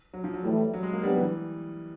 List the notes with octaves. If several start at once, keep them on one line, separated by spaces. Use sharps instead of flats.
F#3
F3
F#3
A2 E3 G3 A3
F#3
G#3
A#3
F#3 G3 B3 D4 G4 B4
E3